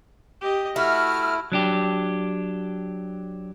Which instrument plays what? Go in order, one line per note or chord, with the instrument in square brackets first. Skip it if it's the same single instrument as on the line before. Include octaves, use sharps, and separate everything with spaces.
[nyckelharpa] G4 D#5
[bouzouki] A3 [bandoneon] E4 [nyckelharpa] F#4 [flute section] F6
[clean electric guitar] F#3 D4 G4